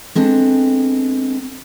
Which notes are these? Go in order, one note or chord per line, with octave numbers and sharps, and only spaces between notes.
G#3 B3 C4 D4 A4